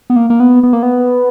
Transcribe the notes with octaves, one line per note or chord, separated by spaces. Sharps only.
B3
A#3
A#3
B3
B3
A#3
B3